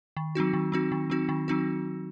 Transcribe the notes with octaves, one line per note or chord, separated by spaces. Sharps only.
D#3
F#3 C4 D#4 F#4
D#3
F#3 C4 D#4 F#4
D#3
F#3 C4 D#4 F#4
D#3
F#3 C4 D#4 F#4